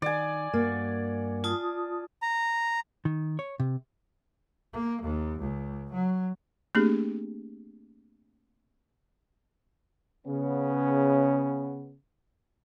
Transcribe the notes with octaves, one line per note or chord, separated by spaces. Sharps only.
D#3 D5 G#5
G2 A#3 F#4
F4 A5 D#6
A#5
D#3
C#5
C3
A#3
D#2
C#2
F#3
A3 A#3 C4 D4 G4 G#4
C#3 B3 C#4